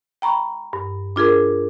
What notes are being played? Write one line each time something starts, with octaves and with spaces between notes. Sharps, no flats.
G5 A#5 B5 C#6
G2
D4 F4 G#4 A#4